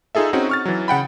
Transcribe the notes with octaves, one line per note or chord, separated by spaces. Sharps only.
D#4 F4 G#4 A4 E5
C4 C#4 D#4 F#4 G#4
C#6 F6 A6
E3 F#3
C#3 F#5 G5 B5